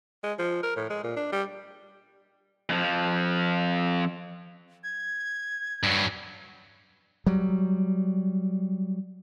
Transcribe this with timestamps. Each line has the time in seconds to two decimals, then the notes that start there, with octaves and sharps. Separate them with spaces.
0.23 G#3
0.39 F3
0.63 A#4
0.76 A2
0.90 G#3
1.04 A#2
1.16 D4
1.32 G3
2.69 F2 F3
4.84 G#6
5.83 G2 F#3
7.26 F#3 G3